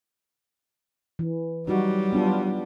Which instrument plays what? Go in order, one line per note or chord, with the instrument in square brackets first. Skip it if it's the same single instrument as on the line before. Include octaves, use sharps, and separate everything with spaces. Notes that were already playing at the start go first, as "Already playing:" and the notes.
[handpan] E3
[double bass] F#3 G3 [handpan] D#4 F#4
[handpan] B3 D4 F4